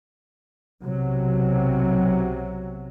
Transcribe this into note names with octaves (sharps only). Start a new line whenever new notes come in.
B1 C3 F#3